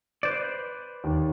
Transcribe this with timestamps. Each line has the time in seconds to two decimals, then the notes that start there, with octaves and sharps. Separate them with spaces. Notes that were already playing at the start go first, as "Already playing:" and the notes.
0.23 B4 C5 D5
1.04 D#2